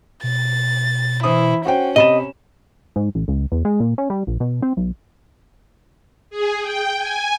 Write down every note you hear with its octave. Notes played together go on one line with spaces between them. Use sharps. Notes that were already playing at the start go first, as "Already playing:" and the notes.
B2 A6
E3 E4 C5 D#6
C#4 F#4 C5 G5
C3 D#5 B5 E7
G#2
A1
C#2
E2
G#3
A#2
C#4
G3
A#1
B2
C4
B1
G#4
G5
G#5